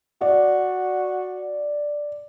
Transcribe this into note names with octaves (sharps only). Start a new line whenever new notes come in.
F#4 D5